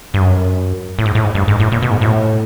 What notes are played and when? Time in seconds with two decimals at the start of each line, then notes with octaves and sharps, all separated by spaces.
0.14 G2
0.20 F#2
0.99 A2
1.06 G#2
1.15 A2
1.24 G#2
1.35 G2
1.48 G#2
1.60 A2
1.72 A#2
1.83 B2
1.91 G#2
2.01 A2